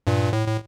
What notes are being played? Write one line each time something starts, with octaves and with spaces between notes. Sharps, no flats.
G2 A#2
A2
A2